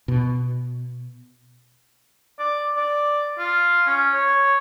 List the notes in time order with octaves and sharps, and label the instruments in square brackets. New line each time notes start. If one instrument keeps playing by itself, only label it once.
[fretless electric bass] B2
[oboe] D5
D5
F4
C#4
C#5